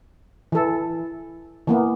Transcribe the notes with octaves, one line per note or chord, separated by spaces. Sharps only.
E3 A4
E3 A#3 B3